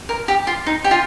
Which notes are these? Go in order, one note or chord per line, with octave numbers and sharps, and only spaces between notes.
A#4
G4
F4
D#4
G4
F4